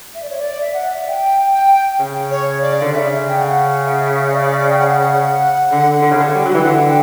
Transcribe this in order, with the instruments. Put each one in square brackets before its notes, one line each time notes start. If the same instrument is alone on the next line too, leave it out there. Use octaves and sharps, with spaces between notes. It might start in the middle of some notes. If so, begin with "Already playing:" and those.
[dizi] E5
D5
C#5
D5
E5
F#5
E5
G5
G5
[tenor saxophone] C#3
[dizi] C#5
D5
[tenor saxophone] D3
[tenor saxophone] C#3 [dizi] E5
[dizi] G5
F#5
E5
E5
D5
G5
F#5
[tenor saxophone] D3
D3
C#3
D3
G3
F#3
[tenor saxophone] E3 [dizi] G5
[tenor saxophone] D3 [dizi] F#5
[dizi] G5